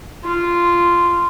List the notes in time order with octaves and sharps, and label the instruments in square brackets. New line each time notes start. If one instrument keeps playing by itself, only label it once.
[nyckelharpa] F4